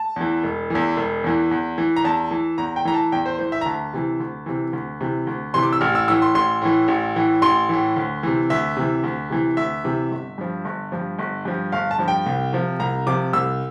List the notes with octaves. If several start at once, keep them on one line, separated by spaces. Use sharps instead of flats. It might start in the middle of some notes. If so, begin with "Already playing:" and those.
Already playing: A5
E2 E3
E1
E2 E3
E1
E2 E3
E2
E3
A#5
E2 A5
E3
E2 A#5
G5
E3 A#5
A5
E2 G5
C5
E3 C5
E5
A#5
D2 A5
C3 E3
D2
C3 E3
D2
C3 E3
D2
C3 E3 C6
D6
E6
A1 F6
E6
A2 E3 E6
C6
A1 C6
A2 E3
A1
A2 E3
A1 C6
A2 E3
D2
C3 E3
D2 E5
C3 E3
D2
C3 E3
D2 E5
C3 E3
G1
G2 F3
G1
G2 F3
G1
G2 F3
G1 F5
A5
G2 F3
G5
C2
C3 F3
C2 A#5
C3 F3 D6
C2 E6